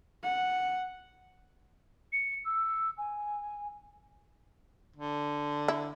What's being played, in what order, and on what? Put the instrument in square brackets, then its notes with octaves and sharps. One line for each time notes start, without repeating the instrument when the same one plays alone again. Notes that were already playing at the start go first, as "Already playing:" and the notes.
[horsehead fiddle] F#5
[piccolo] C#7
E6
G#5
[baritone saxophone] D3
[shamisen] E4